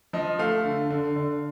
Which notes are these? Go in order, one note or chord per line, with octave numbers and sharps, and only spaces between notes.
F3 D#5
A3 F5
D3
D3
D3